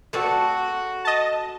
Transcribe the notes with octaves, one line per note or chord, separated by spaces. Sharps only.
A3 C4 F#4 D5
D#5 A5